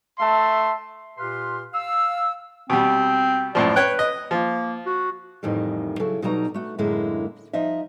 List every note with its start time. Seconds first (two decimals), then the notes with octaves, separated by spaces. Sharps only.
0.19 A3 E5 A5 C6
1.18 A#2 G4 B4 F5 C6
1.73 F5 E6
2.70 B2 G3 C4
3.55 F#2 A2 F3 D5
3.76 B4 C#5 G5 F#6
3.99 D#5
4.31 F3 A#3
4.86 F#4
5.43 F2 A2 D#3 E3 G3
6.00 C#3 F#3 E4 A4
6.22 B2 F#3 G3 D#4 D5 A#5
6.54 A3 F#4
6.78 F#2 A2 D3 G#3 A#3 E4
7.53 F3 D#4 D#5 E5